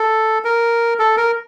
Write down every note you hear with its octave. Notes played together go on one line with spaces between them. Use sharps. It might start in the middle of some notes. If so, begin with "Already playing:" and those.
Already playing: A4
A#4
A4
A#4